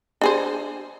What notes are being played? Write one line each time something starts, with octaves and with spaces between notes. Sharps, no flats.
D4 G#4 C5